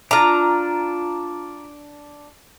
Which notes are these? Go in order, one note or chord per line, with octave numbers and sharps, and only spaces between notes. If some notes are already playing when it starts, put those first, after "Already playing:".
D4 F4 A#5